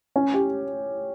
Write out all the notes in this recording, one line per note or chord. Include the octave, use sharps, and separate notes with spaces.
C#4
G4